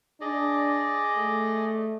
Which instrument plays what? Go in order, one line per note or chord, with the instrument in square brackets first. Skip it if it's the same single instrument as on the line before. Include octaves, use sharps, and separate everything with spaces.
[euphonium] D4 [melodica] G#4 D5 D#5
[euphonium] A3